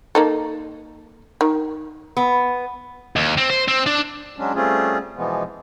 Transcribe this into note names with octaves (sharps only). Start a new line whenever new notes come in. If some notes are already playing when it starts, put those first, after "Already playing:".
A#3 D#4 A4
D#3
B3
D#2
C4
C5
C4
D4
F#3 G#3 C#4 D4
G3 A3 C4 C#4 F4 G#4
B2 E3 F3 G#3 B3